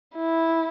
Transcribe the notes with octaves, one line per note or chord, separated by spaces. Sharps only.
E4